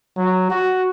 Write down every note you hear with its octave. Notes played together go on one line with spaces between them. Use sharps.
F#3
F#4